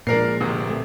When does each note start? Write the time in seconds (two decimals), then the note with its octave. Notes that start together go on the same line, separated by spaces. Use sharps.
0.07 A#2 F3 G#3 D4 A#4 C7
0.41 G1 C3
0.70 A3